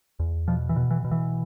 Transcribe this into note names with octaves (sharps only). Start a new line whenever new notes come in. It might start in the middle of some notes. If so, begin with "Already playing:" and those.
E2
B2 F3
E3
B2
E3
B2
E3